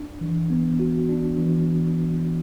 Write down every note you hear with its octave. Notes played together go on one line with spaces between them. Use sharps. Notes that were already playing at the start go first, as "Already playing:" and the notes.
Already playing: D4
E3
B3
F#4
D4
E3